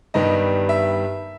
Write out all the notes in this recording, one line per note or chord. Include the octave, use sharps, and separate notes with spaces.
G2 D#3 G3 B3 D#5
E5